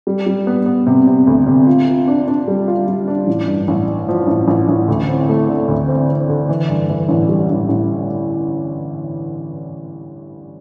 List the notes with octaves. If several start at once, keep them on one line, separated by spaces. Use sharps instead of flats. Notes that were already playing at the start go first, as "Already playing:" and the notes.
G3
G3
B3
B3
C3
C3
D2
C3
F4
F4
D4
D4
G3
F4
G3
D4
A1
G2
A1
G2
F3
A1
A1
A1
D2
C4
A3
D3
D2
C4
C4
D3
E3
G2
E3
A1
G3
A1
A1